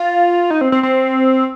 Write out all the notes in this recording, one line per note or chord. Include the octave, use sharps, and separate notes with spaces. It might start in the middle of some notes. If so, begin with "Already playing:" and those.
Already playing: F4
D#4
C4
C4
C4